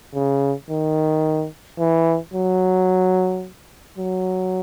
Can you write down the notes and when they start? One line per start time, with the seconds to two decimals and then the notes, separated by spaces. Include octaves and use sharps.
0.15 C#3
0.70 D#3
1.79 E3
2.34 F#3
3.98 F#3